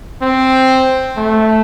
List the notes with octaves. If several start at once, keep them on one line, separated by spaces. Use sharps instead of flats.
C4
A3